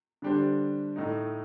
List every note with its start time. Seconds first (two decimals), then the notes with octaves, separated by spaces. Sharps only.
0.22 D3 G3 D4 G4 C5
0.96 A2 A3 D#4